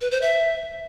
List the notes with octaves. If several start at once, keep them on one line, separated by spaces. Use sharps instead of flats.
B4
C5
E5